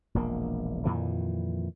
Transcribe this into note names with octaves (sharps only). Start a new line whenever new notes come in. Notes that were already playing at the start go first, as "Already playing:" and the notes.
E1 A#1 A#3
F2 A#2 D#3 E3